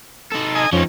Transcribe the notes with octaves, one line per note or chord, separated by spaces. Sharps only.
D#4 A4
D#5 G#5
F2 F3 C#4 D#4